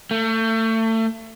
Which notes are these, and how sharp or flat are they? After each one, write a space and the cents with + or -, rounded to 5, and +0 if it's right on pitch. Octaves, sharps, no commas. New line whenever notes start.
A3 +30